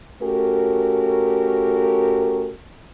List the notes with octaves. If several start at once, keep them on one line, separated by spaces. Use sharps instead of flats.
A3 C#4 F#4 G4 A#4